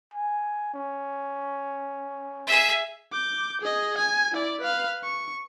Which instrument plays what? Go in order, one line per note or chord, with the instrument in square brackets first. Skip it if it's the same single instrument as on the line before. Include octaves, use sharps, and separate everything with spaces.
[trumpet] G#5
C#4
[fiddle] G#4 E5
[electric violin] D6 G6
G#4 D#5
G#5
E4 D5
B4 F5
C#6